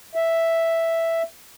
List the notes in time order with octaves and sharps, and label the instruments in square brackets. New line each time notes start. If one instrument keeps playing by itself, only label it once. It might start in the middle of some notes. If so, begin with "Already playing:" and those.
[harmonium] E5